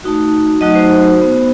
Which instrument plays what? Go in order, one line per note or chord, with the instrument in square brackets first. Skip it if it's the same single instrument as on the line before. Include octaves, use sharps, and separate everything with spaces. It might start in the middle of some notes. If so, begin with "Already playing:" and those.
[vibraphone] A3 D#4 F#4
F#3 A3 D#4 F#4 D#5
C5
B3 D#4 F#4